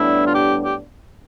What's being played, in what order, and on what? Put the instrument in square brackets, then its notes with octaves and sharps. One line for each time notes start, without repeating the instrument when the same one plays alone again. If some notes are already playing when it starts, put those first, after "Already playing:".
Already playing: [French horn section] A2 G3 B3 D4 [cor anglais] E4
[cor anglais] F4
G4
G4